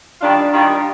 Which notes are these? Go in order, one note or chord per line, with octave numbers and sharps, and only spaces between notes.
D#3 G3 D4 F4
D#3 G3 D4 F4